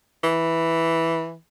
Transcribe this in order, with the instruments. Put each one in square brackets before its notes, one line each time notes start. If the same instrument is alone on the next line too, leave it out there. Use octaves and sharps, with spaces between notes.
[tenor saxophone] E3